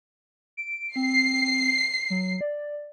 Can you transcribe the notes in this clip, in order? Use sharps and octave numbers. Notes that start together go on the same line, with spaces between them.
D7
C4 C7
F#3
D5